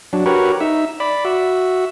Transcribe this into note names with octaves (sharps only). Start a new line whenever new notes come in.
F#3 D4
F#4 G4 A#4 B4 C#5
D#4 E5
D5 B5
F#4 E5